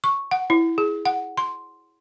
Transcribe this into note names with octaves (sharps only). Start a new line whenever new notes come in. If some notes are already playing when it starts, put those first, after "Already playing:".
C#6
F#5
E4
G#4
F#5
C6